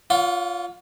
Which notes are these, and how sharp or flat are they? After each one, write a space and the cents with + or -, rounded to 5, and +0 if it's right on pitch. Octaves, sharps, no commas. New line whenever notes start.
F4 +0 C#5 +40 F#5 -45